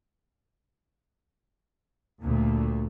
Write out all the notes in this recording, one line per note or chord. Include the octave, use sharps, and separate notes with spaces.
D2 A#2 A3